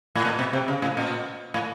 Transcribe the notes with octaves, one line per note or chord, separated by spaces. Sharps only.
A2
A#2
B2
C3
C#3
A2
A#2
A2